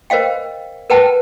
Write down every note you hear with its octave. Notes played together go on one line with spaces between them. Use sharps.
A#4 C5 D#5 F5 G5
A#4 B4 F#5 G5 A5